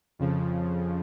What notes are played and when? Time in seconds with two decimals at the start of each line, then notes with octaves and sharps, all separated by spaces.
0.19 F2 C#3 F3